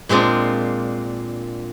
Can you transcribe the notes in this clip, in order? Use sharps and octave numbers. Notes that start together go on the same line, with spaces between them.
A#2 G#3 C4 D4 F4